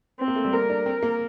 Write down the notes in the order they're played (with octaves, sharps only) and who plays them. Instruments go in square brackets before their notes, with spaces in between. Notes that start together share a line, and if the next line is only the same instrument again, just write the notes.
[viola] C4
[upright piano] A#3
A3
G3
[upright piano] A#3 [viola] A#4
[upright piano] D4
C4
A#3